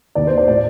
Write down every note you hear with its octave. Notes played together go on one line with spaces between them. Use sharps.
D#2 D#3 D5
C5
D5
A2 D5